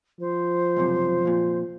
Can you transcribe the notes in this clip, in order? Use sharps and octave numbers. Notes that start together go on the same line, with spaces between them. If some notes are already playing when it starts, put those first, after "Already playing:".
F3 C5
C#2 F#2 C3
F2 A#2